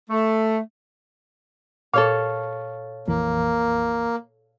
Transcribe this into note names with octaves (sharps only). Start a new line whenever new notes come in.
A3
A#2 A4 C#5 F5
A#1 F2 E3 A#3